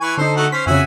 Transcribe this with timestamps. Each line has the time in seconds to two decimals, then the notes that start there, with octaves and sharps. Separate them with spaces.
0.01 E3 G#5 C#6
0.17 D3 D#4 A4 C5
0.36 A3 F#4
0.52 C#4 C5 B6
0.67 F2 C#3 F#4 E5 G#5